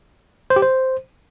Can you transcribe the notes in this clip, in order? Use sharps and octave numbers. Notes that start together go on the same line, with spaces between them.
C5
G4
C5